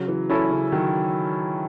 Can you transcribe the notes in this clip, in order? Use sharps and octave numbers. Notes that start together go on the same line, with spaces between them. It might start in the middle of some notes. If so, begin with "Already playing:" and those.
Already playing: C#3 F#3
E3
C#4 E4 A4
C#3
D#3 F#3